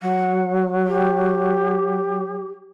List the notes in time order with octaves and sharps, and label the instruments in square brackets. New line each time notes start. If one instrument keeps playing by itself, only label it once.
[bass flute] F#3 [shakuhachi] F#5
[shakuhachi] G4